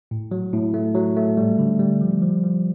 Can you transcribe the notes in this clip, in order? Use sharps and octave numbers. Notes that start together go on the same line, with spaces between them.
A2
F#3
A2
A3
F#3
A3
G3
D3
G3
F3
F3
F3